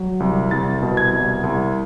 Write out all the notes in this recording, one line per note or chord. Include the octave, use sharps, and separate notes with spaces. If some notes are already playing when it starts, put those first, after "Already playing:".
Already playing: F#3
C2
C2 A6
B2
G#6
C2
C2